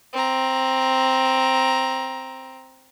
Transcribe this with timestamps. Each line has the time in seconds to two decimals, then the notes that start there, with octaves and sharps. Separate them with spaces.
0.13 C4 A#5